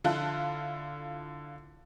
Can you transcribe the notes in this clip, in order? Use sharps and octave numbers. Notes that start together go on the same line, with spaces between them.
D3 E4 F4 A4 A5 F#6